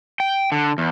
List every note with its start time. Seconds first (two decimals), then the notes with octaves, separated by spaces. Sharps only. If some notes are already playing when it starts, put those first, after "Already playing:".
0.20 G5
0.52 D3
0.78 E2